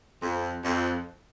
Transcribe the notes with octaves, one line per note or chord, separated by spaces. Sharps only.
F2
F2